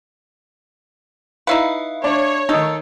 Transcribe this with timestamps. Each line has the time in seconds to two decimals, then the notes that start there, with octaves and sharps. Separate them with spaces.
1.47 D#4 E4 B4 E5 F5
2.04 D4 C#5
2.49 D#3 D#4 A4